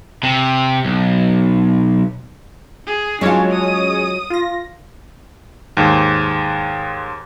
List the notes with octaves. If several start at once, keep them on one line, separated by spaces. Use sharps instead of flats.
C3
B1
G#4
F#3 G#3 C#4 D4 F4 C#5
D#6
F4 A#6
D#2 G#2